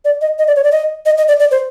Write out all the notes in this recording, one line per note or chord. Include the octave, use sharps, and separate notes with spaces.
D5
D#5
D#5
D5
C#5
D5
D#5
D#5
D#5
D5
D5
C5